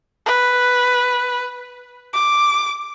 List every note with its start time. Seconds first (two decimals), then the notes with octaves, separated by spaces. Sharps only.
0.26 B4
2.14 D6